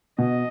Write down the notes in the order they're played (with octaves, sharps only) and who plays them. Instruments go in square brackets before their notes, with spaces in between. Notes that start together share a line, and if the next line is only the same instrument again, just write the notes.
[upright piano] B2 [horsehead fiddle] D#5